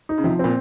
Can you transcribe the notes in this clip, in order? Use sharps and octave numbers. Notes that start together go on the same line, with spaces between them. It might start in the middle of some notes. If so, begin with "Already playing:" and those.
D#4
C#3
C3 F3
A#2 C4